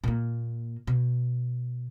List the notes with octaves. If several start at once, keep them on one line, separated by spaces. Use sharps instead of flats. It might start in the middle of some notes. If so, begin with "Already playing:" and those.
A#2 A#3
B2